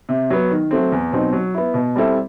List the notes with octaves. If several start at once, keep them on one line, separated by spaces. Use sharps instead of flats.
C3
F#3 B3
D#3
F#3 A3 C4
E2
B2 F#3 C4 D#4
F#3
B3 E4
B2
G3 C4 E4 A4